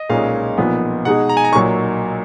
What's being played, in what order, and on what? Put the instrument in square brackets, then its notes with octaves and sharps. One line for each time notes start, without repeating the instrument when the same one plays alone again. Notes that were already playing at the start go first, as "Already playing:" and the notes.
Already playing: [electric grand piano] D#5
[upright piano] B1 A#2 G#3 C#4 [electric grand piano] F5
[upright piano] B1 A#2 F3 B3
[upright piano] B2 G#3 D#4 G#4 [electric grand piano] F#5
[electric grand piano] A#5
G#5
A#5
[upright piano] B1 [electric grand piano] C#6
[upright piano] A#2 F#3